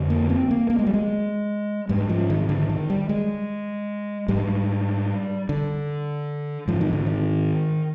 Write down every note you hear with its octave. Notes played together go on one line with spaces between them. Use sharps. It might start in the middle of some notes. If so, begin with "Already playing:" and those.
Already playing: F2 D3
A#3
C4
A#3
A#3
G#3
G3
G#3
G#2 G3
F3
D#3
D3
D#3
G3
G#3
G#2 G3
D3
G#2 F3
D#3
D3
D#3